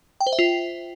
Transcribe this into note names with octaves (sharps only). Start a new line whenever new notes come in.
G5
C5
E5
F4